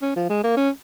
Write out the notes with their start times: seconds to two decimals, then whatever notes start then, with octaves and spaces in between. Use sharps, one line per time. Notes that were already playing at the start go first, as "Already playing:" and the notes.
0.02 C#4
0.16 F3
0.29 G#3
0.43 A#3
0.57 C#4